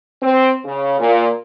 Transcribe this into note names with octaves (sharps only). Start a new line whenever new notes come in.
C4
C#3
A#2